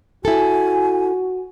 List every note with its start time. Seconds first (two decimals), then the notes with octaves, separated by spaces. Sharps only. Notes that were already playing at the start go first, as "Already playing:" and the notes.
0.25 E4 F#4 A4 G#5